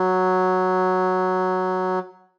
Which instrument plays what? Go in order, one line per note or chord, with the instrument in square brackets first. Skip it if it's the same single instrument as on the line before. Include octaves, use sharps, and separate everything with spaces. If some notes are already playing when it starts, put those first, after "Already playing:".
Already playing: [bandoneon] F#3